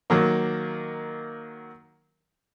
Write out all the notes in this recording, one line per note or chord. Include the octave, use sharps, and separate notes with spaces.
D#3 F#3 A#3